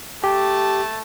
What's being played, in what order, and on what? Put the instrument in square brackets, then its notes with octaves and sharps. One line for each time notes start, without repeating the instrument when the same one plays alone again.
[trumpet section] A3 A5 [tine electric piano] G4